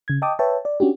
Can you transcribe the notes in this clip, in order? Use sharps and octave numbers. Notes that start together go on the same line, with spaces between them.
C#3 G#6
D#5 G5 A5 D6 D#6
B4 C#5 E5 G5 A5
D5
C#4 D4 F#4 G4